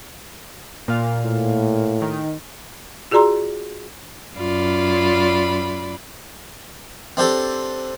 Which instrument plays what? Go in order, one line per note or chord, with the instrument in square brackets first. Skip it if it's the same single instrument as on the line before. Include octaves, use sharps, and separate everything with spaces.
[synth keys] A#2 F5
[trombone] A2
[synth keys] D#3
[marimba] F4 F#4 G#4 D5 A#5 C6
[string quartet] F#2 F4 D5 B5
[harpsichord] C4 D4 G4 A4